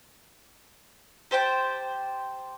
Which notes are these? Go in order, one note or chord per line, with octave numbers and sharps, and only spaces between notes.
G4 C5 G5 A5